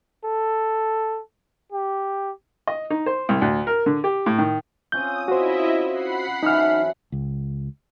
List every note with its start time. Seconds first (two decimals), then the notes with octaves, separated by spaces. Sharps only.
0.24 A4
1.72 G4
2.67 D#5
2.90 D#4
3.06 C5
3.29 C2
3.42 D2
3.67 A#4
3.86 D3
4.04 G4
4.26 A2
4.38 D#3
4.92 C4 C#4 F4 D#6 G6
5.28 E4 F#4 C5 D#5 E5
5.90 F#5 B5 C7
6.43 F#2 E3 D#4 A4 F6
7.12 C#2